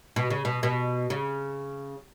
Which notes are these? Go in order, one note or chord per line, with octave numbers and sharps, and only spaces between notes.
B2
C#3
B2
B2
C#3